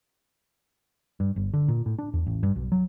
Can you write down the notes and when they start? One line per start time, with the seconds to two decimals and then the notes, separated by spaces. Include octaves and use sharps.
1.20 G2
1.36 G1
1.54 D3
1.68 A#2
1.86 A2
1.99 D4
2.14 E2
2.27 A1
2.43 G2
2.56 B1
2.72 F#3